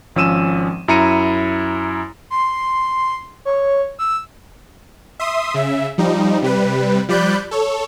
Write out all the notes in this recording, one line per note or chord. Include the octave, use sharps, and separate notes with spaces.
G#1 F3 C#4 E6 D#7 E7
F#2 E4 A#5 C#7 D#7
C6
C#5
E6
E5 C6 D#6
C#3 E5
F3 G3 D#4
C3 G3 B4
F3 G3 D5 B5 F#6 G6
A4 C#5